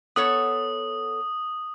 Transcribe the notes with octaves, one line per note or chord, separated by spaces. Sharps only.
B3 A4 C#5 D#6